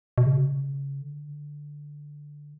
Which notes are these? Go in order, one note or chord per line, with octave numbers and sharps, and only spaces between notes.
B2
C#3
D3